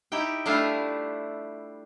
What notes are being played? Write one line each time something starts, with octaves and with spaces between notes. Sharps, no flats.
D#4 E4 G4 G5
G3 A3 D4 E4 F4 F5